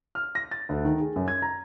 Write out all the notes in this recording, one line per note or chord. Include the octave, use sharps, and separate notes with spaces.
F6
A#6
A6
D2
D#3
G#4
F#2
G#6
A#5